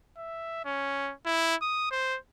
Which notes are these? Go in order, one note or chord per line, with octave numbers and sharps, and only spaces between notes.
E5
C#4
E4
D#6
C5